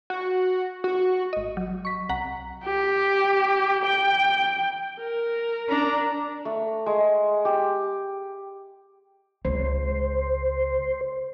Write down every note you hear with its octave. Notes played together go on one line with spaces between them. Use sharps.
F#4
F#4
G#1 D#5
F#3
C#6 B6
C2 F#5 A#5 B6
G4
G5
A#4
D4 A#5
A3
G#3
G4
C#2 C5